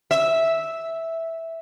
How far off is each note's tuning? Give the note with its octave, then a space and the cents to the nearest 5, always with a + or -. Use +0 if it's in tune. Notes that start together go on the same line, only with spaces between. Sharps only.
E5 -5